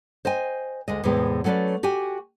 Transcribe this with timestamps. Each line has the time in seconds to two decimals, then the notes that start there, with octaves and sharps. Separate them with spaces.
0.25 C5 D#5 G5 G#5
0.88 D2 G#3 D#5
1.04 E2 A2 C3 G#3 B3
1.44 F#3 A3 C#4 A4 B4 D5
1.83 F#4 G4 G5 G#5